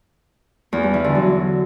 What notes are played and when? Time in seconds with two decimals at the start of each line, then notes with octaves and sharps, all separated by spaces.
0.73 E2
0.83 G2
0.94 E3
1.04 D3
1.15 F#3